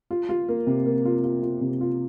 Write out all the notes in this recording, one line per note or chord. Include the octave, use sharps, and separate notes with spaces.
F4
F4
A#3
C3
A#3
F4
F4
F4
C3
F4